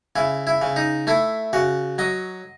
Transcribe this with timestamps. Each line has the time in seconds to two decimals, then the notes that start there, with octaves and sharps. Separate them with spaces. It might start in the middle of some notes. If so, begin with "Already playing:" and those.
0.16 C#3 E4
0.47 E4
0.62 C#3
0.76 D#4
1.07 A3 E4
1.53 C#3 F#4
1.98 F#3 D#5